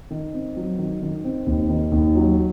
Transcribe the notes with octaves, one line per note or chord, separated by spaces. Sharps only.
D#3
C4
F#3
D#3
D#3
C4
D#2
D#3
D#2
F#3